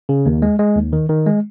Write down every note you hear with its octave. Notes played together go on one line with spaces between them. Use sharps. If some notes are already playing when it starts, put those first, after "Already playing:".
C#3
D#2
G#3
G#3
D#2
D#3
D#3
G#3